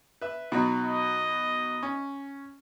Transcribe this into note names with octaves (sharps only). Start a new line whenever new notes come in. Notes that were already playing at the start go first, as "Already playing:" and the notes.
B4 E5
B2 F#3 D#4
D#5
C#4